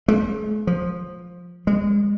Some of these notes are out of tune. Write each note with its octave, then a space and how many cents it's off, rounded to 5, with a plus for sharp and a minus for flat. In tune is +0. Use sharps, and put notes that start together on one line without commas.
G#3 +45
F3 +10
G#3 -30